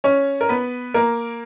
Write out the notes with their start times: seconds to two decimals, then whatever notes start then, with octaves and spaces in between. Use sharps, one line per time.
0.04 C#4 C#5
0.41 A#4
0.49 B3 B4
0.94 A#3 A#4